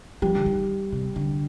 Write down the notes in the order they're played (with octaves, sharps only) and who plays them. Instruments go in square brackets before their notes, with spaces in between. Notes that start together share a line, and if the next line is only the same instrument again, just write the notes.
[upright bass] F3 [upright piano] G3 G4
[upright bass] D3
D#3
C3
D3